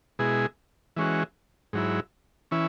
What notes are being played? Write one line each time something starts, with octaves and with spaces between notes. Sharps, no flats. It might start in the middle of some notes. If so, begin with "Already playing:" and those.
B2 G#3 E4 G#4
E3 G#3 C#4 F#4
G#2 F#3 E4
E3 C#4 E4